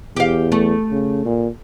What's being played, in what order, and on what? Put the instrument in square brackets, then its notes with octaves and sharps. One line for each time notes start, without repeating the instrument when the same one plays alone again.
[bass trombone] E2 [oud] G4 F5
[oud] A3
[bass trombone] C#3
A#2